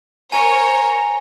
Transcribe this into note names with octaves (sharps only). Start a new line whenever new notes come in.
A#4 C5 C#5 G#5 A#5